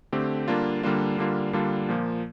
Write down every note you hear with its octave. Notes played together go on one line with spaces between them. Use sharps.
D3 A3 C4 G4
D3 G3 A#3 D4 F4
D3 G3 A#3 D4 F4
D3 G3 A#3 D4 F4
D3 G3 A#3 D4 F4
A#2 F3 A#3